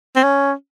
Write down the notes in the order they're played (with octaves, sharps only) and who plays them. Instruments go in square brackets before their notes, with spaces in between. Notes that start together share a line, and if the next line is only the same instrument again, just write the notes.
[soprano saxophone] C4
C#4